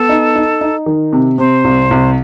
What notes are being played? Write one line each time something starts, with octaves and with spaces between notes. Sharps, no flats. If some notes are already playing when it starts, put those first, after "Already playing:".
Already playing: B3 A4
D#4
D#4
D#4
D#3
C3
C3 C5
C2
C2